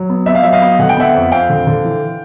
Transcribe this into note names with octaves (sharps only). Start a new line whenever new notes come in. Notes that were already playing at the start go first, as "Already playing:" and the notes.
Already playing: F#3
B3
B3 E5
F5
F#3 E5
D#5 F5
B3
D3 F#5
G5
B3 E5 F#5
F2
F2 F5 G5
D3
D3
E3